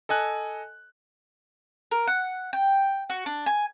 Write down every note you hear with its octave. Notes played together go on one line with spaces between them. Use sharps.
A4 D#5 G#5 F#6
A#4
F#5
G5
F#4
D4
G#5